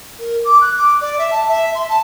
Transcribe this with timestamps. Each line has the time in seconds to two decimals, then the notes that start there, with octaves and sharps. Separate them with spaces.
0.19 A#4
0.44 D6
0.61 F#6
0.76 D6
1.01 D5
1.18 E5
1.31 A5
1.48 E5
1.75 C6
1.89 A5